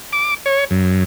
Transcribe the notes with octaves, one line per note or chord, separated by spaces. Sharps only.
D6
C#5
F#2